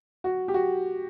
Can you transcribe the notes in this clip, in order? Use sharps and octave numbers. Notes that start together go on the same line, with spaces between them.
F#4
G4
F#4